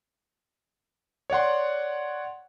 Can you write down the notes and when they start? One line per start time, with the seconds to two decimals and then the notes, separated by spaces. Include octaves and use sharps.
1.30 C#5 D5 F#5 C6